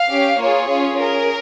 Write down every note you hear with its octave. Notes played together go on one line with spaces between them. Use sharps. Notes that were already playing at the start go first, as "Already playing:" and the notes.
Already playing: F5
C#4 G4
A#3 F4 G#4 C#5
C#4 F4 G#4
C#4 G#4 A#4